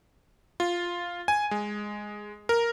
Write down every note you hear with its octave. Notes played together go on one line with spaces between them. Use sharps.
F4
G#5
G#3
A#4